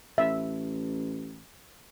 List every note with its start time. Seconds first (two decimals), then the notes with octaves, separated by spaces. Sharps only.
0.18 A1 E5